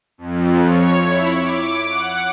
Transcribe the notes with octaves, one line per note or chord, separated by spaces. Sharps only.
F2
C#5
E4
D6
F#5